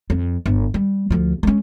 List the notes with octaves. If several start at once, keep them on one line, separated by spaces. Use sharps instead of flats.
F2
G1
G3
D2 F3
G#3 C#4